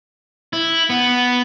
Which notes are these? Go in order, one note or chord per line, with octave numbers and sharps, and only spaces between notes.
E4
B3